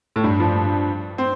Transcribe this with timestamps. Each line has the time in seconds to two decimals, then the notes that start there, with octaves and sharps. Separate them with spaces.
0.16 A2
0.24 G2
0.40 F3
1.18 C4